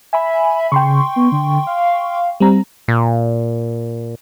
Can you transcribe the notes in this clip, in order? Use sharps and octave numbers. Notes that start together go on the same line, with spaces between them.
E5 G#5 B5
C#3 G5 C6 C#6
B3
D3
F5
G3 C4 A#5
A#2